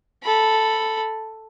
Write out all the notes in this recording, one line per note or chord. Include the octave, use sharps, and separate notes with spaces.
A4 B5